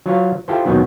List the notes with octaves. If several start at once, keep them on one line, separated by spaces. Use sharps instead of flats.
F#3 F4 C#5 F5
E4 F4 G4 A4 C5
D#2 B2 D#3 F#3 B3 D#4